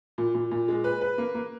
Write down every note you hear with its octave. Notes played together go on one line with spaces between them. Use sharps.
A#2
A#2
A#2
G#3
B4
B4
A#3
A#3